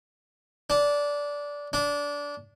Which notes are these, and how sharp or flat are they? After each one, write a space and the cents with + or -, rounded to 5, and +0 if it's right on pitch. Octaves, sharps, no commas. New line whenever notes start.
D4 -15
D4 -20